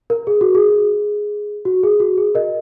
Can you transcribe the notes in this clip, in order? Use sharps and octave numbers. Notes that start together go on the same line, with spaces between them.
A#4
G#4
F#4
G#4
F#4
G#4
F#4
G#4
A#4 D#5